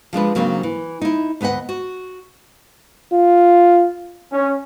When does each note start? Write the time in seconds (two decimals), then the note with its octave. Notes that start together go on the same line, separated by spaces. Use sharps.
0.13 F3 G#3 D4 B4
0.35 C#3 F#3 A#3 C4 D4 D#4
0.63 E3
1.01 D#4 E4
1.41 D2 B3 B4 D#5 F#5
1.69 F#4
3.12 F4
4.33 C#4